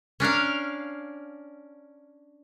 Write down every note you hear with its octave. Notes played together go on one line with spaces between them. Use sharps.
C#4 D4 A#4 F5